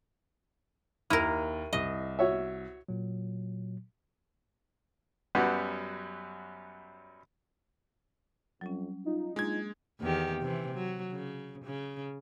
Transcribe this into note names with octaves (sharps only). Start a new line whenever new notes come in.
D#2 E4 A#4 F6 D#7
C2 D#5
F#4 C#5 E5
A#2 F#3
F#2 F#3 G3 B3 F#4
F2 F#3 G3 C#4
D#4 F4
G#3 A#3 D4 F4 G#6
E2 D#3 G4
C3 E3
F#3
C#3
C#3